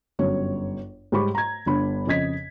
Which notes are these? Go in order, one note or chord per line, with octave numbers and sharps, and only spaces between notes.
G1 F#2 C#5
G#2 G3 C#5 B5 C#6 D6
A#5 G#6
G1 D4 B5
F2 C#3 D#5 G#6 B6